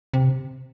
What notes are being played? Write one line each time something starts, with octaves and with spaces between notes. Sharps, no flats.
C3